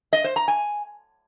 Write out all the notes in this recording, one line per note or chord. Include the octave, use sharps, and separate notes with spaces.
D#5
C5
A#5
G#5